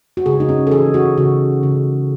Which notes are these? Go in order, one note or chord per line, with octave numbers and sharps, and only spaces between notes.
F#4
C#3 G#4
D#4
C#4
A4
E3 G#4
F#4
C#3 F#4
C#3